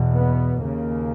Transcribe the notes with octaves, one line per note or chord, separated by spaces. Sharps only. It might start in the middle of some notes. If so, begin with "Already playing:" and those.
Already playing: E2 B2
B3
D#2 C#3 A#3